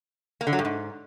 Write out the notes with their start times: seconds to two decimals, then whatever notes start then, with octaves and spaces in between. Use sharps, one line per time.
0.41 A#3
0.47 D3
0.53 F#3
0.59 G2
0.65 G#2